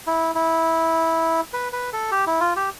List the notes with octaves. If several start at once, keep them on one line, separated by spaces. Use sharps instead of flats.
E4
E4
B4
B4
A4
G4
E4
F4
G4